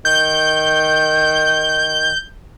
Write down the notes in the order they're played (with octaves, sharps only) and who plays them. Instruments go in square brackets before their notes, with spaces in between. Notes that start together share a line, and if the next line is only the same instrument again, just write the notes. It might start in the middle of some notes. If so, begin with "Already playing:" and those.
[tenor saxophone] D#3 [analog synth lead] G6